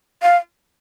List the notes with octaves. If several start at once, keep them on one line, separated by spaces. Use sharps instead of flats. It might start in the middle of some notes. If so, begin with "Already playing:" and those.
F5